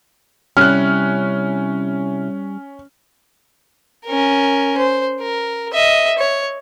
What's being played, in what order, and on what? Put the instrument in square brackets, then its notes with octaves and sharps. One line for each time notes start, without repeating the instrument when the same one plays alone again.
[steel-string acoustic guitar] C3 E4 [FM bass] G3 [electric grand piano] C#4 [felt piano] F6 F#6
[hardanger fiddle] C#4 A#4
C5
A#4
D#5 E5
C#5